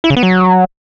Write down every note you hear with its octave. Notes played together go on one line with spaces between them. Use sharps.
E4
C#3
B3
F#3